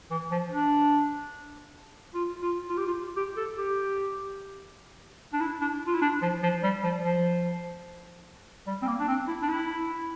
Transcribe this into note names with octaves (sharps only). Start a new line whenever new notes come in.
E3
F3
D4
F4
F4
F4
G4
F4
G4
A4
G4
D4
E4
D4
F4
E4
D4
F3
F3
G3
F3
F3
G3
C4
A#3
D4
C4
E4
D4
E4